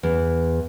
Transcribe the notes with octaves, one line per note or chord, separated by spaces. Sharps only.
E2